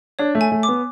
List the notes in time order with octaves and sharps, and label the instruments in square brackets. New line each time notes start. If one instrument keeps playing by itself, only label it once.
[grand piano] D4 [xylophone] C#5
[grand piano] A3
[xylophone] G#5
[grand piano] A3
[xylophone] D6
[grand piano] B3